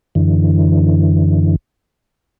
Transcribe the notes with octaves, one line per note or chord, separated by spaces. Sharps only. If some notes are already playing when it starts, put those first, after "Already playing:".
F#2 D3 E3